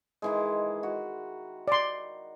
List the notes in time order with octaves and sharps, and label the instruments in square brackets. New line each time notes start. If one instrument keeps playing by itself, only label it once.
[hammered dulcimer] D#3 E3 G#3
F#4
[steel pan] D5 C6